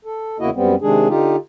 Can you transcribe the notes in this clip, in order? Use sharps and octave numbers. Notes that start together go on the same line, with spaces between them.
A4
E2 C#3 A#3 E4 F#4 D#5
F#2 G3 B3 C4
C3 D#3 G#3 D4 G#4
D3 D#4 F4 G4